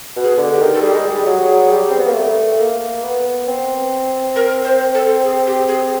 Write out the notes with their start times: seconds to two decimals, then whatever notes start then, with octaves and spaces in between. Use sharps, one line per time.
0.16 B2
0.24 G#4
0.38 D3
0.53 G4
0.60 D#3
0.74 A4
0.82 G3 G#4
0.94 G#3
1.05 G3
1.26 F#3
1.71 G3
1.90 C4
1.98 B3
2.06 A#3
2.14 A3
2.59 A#3
3.03 B3
3.48 C4
4.36 A#4
4.65 C5
4.95 A4
5.24 G#4
5.47 G4
5.68 G#4